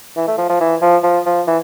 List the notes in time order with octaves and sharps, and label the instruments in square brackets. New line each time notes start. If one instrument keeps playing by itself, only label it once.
[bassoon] E3
A3
F3
F3
E3
F3
F3
F3
E3